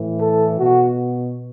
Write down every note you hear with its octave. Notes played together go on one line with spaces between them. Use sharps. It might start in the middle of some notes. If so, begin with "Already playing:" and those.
Already playing: A2 E3
A4
B2 F#4